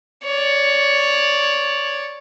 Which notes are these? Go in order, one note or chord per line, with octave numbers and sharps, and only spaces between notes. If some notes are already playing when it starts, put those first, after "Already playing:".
C#5 D5